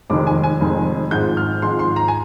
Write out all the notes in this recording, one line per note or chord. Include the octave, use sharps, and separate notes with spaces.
F1 F2 D#3 G#3 D6
G#5
G#5
F1 F2 D#3 G#3
G#1 G#2 F3 G#3 G6
F6
G#1 G#2 F3 G#3 C6
C6
A#5
G#5